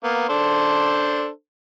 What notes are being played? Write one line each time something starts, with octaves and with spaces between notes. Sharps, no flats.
A#3 B3
D4 A4 C5